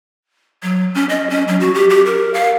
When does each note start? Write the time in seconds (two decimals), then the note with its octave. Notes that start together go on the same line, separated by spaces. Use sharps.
0.63 F#3
0.95 C#4
1.09 D#5
1.30 C#4
1.48 F#3
1.60 F#4
1.75 G4
1.90 G4
2.06 A#4
2.34 F5